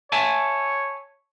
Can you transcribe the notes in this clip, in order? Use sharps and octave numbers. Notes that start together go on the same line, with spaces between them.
C#5 E5 G#5 A5